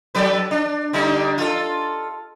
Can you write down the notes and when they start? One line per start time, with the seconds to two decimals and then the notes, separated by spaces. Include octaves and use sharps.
0.15 F#3 A4 B4
0.51 D4
0.93 D3 G3 D#4
1.38 F4 A4